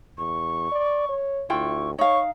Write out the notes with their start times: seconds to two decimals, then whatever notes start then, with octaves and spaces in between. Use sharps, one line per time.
0.18 E2 C#6
0.72 D5
1.09 C#5
1.50 D2 E4 F4 G5 C#6
1.98 D#4 C#5 F5 C#6